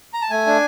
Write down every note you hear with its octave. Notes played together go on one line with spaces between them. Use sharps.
A#5
A5
A3 G#5
D4